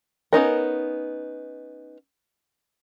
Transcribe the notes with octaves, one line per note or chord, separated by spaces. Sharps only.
B3 C#4 D#4 A#4